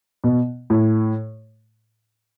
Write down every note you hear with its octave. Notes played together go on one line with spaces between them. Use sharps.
B2
A2